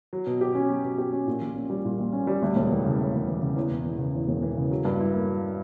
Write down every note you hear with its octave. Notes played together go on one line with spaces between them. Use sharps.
F#3
B2
G4
C#4
F#3
B2
G4
C#4
A#2
A#1
C#4
G3
A#2
A#1
C#4
G3
D2
E1
E3
C#3
D2
E1
E3
C#3
E2
E1
E3
C#3
E2
E1
E3
C#3
F#3
G2
E4
A#3
F#3